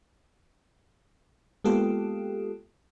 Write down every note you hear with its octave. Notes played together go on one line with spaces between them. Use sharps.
G#3 A#3 B3 F4 G4 A4